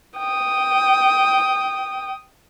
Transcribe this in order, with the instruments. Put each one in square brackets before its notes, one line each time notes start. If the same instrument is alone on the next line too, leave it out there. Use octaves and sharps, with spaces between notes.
[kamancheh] G5 D#6